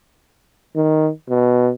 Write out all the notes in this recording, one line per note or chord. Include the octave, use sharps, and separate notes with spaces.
D#3
B2